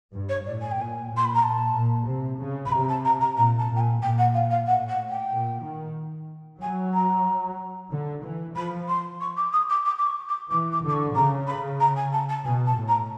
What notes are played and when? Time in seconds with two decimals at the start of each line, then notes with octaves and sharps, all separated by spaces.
0.13 G2
0.29 C#5
0.46 A2 D5
0.62 G#5
0.72 G5
0.78 A#2 G#5
1.11 A#2
1.17 C6
1.25 B5
1.34 A#5
1.42 A#2 A5
1.75 A#2
2.08 C3
2.40 C#3
2.66 B5
2.72 C3 A#5
2.89 A5
3.05 A#5
3.21 A#5
3.37 A#2 A#5
3.59 A5
3.70 A#2
3.76 G5
3.80 G#5
4.02 A#2 G5
4.18 F#5
4.34 F5
4.51 F5
4.67 A2 F#5
4.89 F#5
5.10 G5
5.32 A#2
5.64 D#3
6.61 F#3 G#5
6.94 A#5
7.91 D3
8.23 E3
8.56 F3 B5
8.88 C6
9.21 C#6
9.37 D6
9.53 D#6
9.70 D6
9.86 D6
9.98 D6
10.07 C#6
10.29 D6
10.50 E3 D6
10.72 D6
10.83 D3 D6
10.93 C#6
11.15 C#3 A#5
11.47 B5
11.80 A#5
11.96 G#5
12.13 A5
12.29 A5
12.45 B2 G#5
12.66 A5
12.77 A2
12.88 A#5